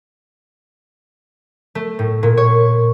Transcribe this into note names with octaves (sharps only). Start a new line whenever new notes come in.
A3
A2
A#2
C#5